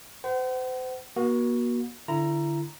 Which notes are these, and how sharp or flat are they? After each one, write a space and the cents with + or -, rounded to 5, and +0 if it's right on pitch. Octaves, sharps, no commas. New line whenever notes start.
C5 -35 F#5 +35
A#3 +45 F#4 +0
D3 +0 E4 +30 A#5 +0